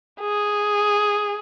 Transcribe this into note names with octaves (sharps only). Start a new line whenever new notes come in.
G#4